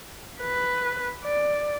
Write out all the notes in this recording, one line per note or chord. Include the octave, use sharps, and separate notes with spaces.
B4
D5